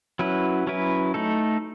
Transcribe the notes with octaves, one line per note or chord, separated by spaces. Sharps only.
F#3 C#4 E4 B4
F#3 C#4 E4 B4
A3 D#4 A4